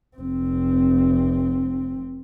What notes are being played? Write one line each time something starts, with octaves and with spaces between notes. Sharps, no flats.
F1 C4